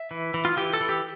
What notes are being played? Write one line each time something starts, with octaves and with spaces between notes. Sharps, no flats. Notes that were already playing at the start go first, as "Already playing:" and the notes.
Already playing: E5
E3
E3
F4
E3 G4
A4
E3
G4